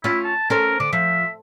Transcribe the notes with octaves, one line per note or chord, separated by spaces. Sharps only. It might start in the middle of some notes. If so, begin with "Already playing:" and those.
C#4 E4 F4
A5
C#4 A4 A#4 C5
D3 D6
F3 E5